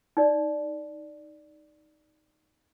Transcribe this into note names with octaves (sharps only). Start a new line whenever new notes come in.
D#4 D5